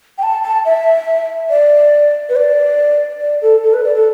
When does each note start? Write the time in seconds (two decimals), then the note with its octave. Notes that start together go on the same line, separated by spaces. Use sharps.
0.18 G5
0.23 A5
0.44 A5
0.65 E5
1.50 D5
2.29 B4
2.36 D5
3.21 D5
3.42 A4
3.63 A4
3.73 B4
3.84 D5
3.95 A4